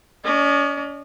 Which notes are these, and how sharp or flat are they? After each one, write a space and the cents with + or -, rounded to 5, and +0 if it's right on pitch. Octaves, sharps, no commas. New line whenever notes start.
C#4 +35 D#5 -35